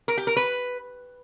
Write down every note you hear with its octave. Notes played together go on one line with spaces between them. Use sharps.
A#4
G4
A#4
B4